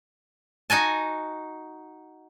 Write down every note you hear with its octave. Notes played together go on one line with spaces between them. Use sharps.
D#4 F#4 G#5 A5